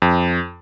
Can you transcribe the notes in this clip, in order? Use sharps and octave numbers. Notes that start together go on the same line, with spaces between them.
F2